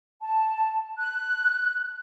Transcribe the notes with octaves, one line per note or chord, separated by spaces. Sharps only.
A5
F#6